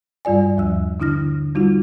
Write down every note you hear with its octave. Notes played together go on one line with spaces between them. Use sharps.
G2 G3 F4 D5 G#5
D#2 F3 E6
D3 D4 E4 F6 A#6
G3 D#4 F4 F#4